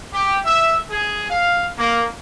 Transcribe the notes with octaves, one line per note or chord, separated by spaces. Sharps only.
G4
E5
G#4
F5
A#3